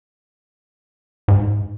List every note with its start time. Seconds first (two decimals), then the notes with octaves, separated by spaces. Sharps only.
1.28 G#2